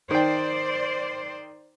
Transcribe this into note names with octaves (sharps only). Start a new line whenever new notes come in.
D#3 C5 D5 G5